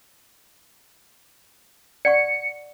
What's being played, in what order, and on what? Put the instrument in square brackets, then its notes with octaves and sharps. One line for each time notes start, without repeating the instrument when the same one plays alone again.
[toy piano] D5 F#5 C#6 [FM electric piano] C#7